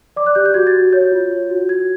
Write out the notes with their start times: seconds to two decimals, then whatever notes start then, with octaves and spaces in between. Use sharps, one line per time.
0.16 D5 D6
0.26 F#6
0.35 G4 G6
0.46 G6
0.54 F#4 G#6
0.67 A6
0.74 F#4
0.93 C#5 G6
1.12 F4
1.31 C#5
1.50 F#4
1.69 F#4 G#6